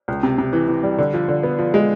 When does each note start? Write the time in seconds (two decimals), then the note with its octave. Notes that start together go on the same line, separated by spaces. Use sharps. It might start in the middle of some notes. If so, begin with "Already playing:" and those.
0.08 C#2
0.23 C3
0.38 C3
0.53 E3
0.68 E3
0.83 G3
0.98 D3
1.14 F3
1.28 D3
1.43 B3
1.59 F3
1.74 G#3